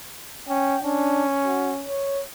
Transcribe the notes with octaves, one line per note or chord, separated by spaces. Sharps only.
C#4 G5
C#4 D4
F#4
C#5